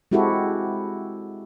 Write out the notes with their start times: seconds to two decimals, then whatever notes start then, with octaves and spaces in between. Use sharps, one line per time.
0.11 G#3 C4 E4 F#4 G4 A4